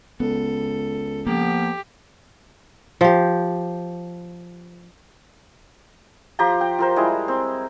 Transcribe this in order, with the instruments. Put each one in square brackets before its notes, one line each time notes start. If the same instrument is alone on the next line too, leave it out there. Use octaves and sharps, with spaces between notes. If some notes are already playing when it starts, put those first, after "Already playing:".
[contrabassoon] C#2 [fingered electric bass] B3 [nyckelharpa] A4
[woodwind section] F3 B3 [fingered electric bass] A#3 [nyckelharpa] G4
[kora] F3 G4
[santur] F3 G4 A#5 C6
G5
F4 A#4 C5
G3 G#3 E4
C4